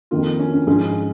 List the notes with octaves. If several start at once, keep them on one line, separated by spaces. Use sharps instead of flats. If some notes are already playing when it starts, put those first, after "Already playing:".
F2 D#3 A#3 F4
C#4
C#4
G#2 F3 G#3 C#4